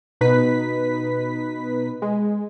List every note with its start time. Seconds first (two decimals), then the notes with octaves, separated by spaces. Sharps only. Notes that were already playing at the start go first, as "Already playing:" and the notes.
0.21 B2 D#4 B4 B6
2.02 G#3